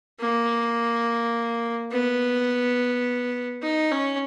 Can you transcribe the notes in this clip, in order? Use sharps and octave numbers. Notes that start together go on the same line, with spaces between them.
A#3
B3
D#4
C#4